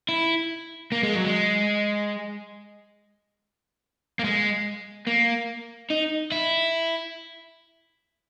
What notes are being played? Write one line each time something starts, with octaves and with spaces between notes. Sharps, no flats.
E4
A#3
G#3
F#3
G#3
A#3
G#3
A#3
D#4
E4